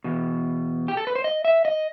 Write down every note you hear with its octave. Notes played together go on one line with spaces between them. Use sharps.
E2 B2
G4
A4
B4
C5
D#5
E5
D#5